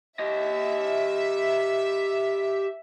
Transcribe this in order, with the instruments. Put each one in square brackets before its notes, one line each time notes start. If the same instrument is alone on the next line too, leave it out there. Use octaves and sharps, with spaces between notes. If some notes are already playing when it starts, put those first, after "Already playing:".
[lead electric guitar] G4 D#5 [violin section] E5